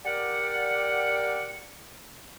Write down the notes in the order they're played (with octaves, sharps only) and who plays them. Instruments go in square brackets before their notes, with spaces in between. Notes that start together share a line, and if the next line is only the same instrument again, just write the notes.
[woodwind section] G4 A#4 D5 F#5